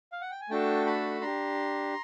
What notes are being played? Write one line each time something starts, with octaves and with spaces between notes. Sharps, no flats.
F5
F#5
G5
G#5
A3 D4 F#4 A4 G5 A5
A5 B5
D4 G4 A#5 C6